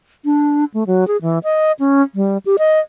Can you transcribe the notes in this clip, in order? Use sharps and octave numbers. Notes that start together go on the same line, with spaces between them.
D4
A3
F#3
G#4
E3
D#5
C#4
G3
G4
D#5